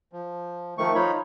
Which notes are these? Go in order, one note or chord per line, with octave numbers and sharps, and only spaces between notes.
F3
D#3 F3 A3 C#6
F3 D#4 F4 C#5 B5